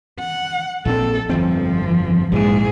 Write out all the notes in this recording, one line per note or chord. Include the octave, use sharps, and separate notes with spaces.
F#5
A#1 A#2 C4 A4
G1 F2 F3 C4
A#1 G#2 D#3 E3 G#4